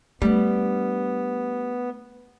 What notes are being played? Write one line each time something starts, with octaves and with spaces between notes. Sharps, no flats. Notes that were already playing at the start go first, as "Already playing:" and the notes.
G3 A3 B3 D4